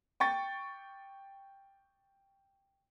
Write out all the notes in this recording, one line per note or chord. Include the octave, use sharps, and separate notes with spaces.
G5 C#6 A6